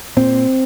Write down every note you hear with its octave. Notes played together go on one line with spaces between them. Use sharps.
A#2 C4